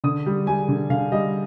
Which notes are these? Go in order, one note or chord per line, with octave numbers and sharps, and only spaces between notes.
D3 D#6
G3
G3 G#5
D3
D3 F5
G3 D#5